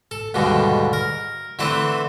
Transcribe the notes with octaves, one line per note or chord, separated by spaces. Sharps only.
A4
D#2 G#2 B2 D3 G3
A#4
D3 E3 A3 C4 B4